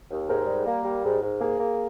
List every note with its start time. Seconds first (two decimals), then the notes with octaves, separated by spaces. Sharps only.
0.11 D#2
0.29 G#2 A#4
0.47 G3
0.66 A#3
0.85 G3
1.04 G#2
1.22 G#2
1.40 A#3 G#4
1.60 A#3